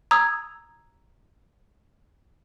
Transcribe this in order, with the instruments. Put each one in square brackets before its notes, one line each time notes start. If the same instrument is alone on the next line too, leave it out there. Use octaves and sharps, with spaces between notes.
[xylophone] A#5 D#6 E6 G#6